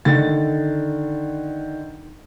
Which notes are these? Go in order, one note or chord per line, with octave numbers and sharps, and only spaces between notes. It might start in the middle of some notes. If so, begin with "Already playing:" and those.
D3 D#3 A6